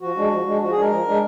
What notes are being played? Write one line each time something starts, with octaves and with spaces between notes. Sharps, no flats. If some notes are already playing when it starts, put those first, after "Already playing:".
F3 F#4
G#3 D4
F3
G#3 D4
F3 F#4
G#4
G#3 D4 A#4
F3
G#3 D4